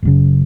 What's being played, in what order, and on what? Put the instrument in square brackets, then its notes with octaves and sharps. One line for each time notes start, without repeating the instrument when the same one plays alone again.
[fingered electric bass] F#1 F#2 C#3